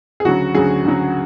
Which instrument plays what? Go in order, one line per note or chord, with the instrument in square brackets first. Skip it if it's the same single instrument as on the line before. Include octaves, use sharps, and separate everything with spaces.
[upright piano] G#4
D2 C#3 F#3 F#4
D2 C#3 F#3 G#4
D2 C#3 F#3